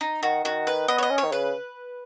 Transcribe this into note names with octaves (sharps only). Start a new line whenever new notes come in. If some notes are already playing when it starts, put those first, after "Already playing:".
D#4
D#3 F#4
D#3 F#4
B4
B3 D#5
C#5
D#5
C#4
C#5
D#3
C#3 B4